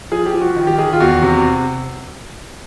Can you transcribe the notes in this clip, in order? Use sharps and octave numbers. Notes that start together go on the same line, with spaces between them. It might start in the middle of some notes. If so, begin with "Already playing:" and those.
F3 G#4
G4
F3
F#4
D#3
G4
D#3 G#4
F4
E2 F#4
C3